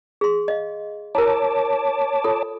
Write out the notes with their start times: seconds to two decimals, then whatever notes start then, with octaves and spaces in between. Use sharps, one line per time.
0.21 G#4 C6
0.48 D#5 F5
1.15 E4 A#4 C#5 A5 D6
2.24 F4 A4